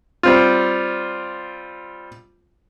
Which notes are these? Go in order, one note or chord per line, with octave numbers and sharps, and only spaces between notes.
G3 C4 F4